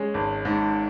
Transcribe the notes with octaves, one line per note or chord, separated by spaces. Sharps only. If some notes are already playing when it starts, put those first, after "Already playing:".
Already playing: G#3 C#4
G#1
G#2